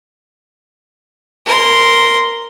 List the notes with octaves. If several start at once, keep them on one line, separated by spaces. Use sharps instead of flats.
A#4 C6